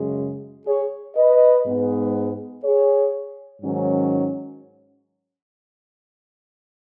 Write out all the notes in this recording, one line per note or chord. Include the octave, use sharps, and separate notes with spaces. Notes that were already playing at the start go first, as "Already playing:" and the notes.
Already playing: F#2 C#3 G#3
G#4 C#5
B4 D#5
G#2 G#3 B3
G#4 C#5
G#2 D#3 F#3 C#4